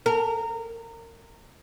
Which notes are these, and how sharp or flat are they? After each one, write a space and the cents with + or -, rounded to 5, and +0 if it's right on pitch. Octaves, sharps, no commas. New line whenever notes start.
A#4 -25